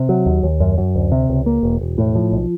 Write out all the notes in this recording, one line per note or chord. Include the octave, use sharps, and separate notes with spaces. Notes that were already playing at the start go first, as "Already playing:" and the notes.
Already playing: C3
F#3
D#2
D#2
F#2
F#2
D2
C3
C#2
A#3
E1
E1
A2
F3
B1